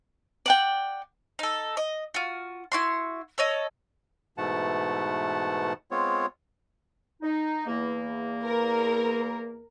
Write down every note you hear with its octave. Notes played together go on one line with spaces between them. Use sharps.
D5 F#5 G5
D#4 A4
D#5
F4 F#4
E4 F#4 C6
A4 C#5 D#5
G#2 B2 E3 A3 F#5 A5
G#3 B3 C4 F4 C#5
D#4
E2 A#3
A#4